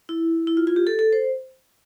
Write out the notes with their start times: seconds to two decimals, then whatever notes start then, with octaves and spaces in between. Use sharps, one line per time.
0.09 E4
0.47 E4
0.57 F4
0.67 F4
0.76 G4
0.87 A4
0.99 A4
1.13 C5